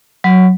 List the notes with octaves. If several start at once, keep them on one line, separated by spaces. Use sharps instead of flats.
F#3